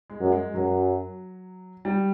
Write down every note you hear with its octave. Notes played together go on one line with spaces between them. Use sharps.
G#3
F#2
G#3
F#2 F#3
G3